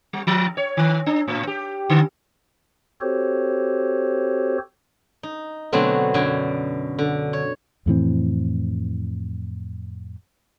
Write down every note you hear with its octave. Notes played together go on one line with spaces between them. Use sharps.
G3
F3
C#5
D#3
D4
A2
G4
D3
C4 F#4 G4 A4 C5 C#5
D#4
B2 D3 F#3 A3 B3 C4
F#2 B2 D3 G5 G#5
D3
C#5
F2 A2 E3 C4